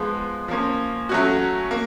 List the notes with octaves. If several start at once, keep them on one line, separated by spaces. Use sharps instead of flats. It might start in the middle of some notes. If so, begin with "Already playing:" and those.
Already playing: F3 G#3 B3
F3 A#3 C#4
F#3 A3 C#4 F#4
A#3